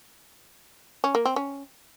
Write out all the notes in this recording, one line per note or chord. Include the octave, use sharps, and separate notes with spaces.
C#4
A#3
C4
C#4